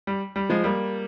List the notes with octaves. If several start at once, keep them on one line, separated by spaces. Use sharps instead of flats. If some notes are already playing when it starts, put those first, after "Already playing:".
G3
G3
F3 G#3
G3 A#3